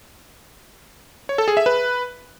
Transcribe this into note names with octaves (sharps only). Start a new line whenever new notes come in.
C#5
A4
G#4
E5
B4